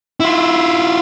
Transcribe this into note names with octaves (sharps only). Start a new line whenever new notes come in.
E4 F4